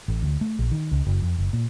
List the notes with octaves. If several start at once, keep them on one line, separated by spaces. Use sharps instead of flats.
A1
D2
A3
A#1
D#3
C#2
F#1
F2
F#1
A#2